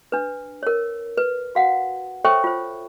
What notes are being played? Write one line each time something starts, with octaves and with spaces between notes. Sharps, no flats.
D4 B4
A#4 C#5
B4
F#4 F5 F#5
A4 C5 C#5 E5 G5 C#6
F4 C5